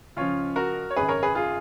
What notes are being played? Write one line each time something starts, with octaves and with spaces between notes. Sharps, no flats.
C#2 C#3 F3 C#4 F4
F#4 A#4
C#5
G#1 F#2 C#3 G#4 B4
A#4 C#5
G#4 B4
F4 G#4